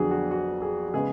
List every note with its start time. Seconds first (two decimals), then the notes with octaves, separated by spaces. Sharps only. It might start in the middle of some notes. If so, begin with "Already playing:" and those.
Already playing: F2 D3 F#3 B3 D4 F#4 G#4
0.11 F#4
0.31 F#4
0.62 G#4
0.89 F#4
0.94 C#3 G#3 B3 G#4